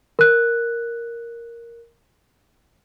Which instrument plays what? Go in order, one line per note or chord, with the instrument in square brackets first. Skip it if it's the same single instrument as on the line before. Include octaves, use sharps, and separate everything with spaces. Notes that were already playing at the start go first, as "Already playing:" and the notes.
[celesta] A#4 F#6